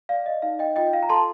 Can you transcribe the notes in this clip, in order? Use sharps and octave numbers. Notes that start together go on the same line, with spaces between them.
D5 F5
D#5
D#4 F5
D#5 G5
F4 D#5 G5
F5
A#5
A4 A5 C6